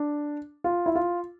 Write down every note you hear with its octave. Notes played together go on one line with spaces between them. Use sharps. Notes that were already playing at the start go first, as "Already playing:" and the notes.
Already playing: D4
F4
E4
F4